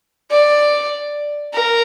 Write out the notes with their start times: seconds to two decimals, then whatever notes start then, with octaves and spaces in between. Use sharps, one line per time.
0.30 D5
1.54 A#4